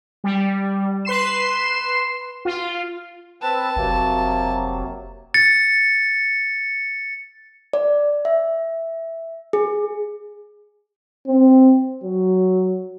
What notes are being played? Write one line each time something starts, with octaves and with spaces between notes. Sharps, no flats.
G3
B4 C6 C7 E7
F4
C4 B4 A5 E6
F1 C3 F#3 A#3
A6 C#7
D5
E5
G#4
C4
F#3